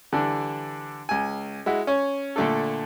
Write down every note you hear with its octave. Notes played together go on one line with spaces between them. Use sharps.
D3 E3 G3 D4
C#2 G#5
G#3 E4 F#4
C#4 C#5
A#2 D3 A3 D4 A4